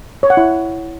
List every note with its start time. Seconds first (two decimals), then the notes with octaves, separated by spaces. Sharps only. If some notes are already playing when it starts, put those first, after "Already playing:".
0.23 C#5
0.30 F#5
0.37 E4